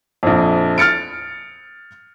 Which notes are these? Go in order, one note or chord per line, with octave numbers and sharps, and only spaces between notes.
A#1 F2
F6 A6 C#7 D7